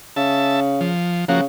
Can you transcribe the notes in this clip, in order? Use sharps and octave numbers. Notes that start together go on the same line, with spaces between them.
C#3 E5 A5
F3
C#3 F3 A#3 F#4